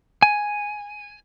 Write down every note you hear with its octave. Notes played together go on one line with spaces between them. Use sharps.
G#5